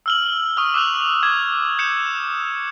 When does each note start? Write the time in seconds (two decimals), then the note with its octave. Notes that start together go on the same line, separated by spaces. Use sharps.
0.06 E6 F6 F#7
0.57 C#6 D#6 F6
0.74 D6 E6 F#6 F7
1.23 D6 G#6
1.79 G6 C#7 E7